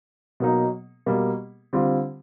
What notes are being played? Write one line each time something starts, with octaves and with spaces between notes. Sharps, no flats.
B2 F#3 A#3 D#4
B2 G3 A#3
D3 G3 C4 F4